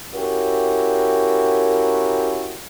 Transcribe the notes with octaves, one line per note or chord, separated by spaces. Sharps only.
C#4 E4 F#4 G4 A#4